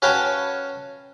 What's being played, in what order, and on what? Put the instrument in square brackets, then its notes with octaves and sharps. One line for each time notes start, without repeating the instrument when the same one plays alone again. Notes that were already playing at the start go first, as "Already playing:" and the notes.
[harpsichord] C#4 F#4 B4 F5 G5 A5